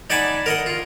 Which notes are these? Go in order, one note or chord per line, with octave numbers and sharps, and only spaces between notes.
D#4 D5 F#5 G#5 A5 B5
A#4 D#5 F#5
F4